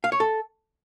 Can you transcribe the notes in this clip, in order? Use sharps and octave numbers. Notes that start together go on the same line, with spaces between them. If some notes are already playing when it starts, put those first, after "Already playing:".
F5
C#5
A4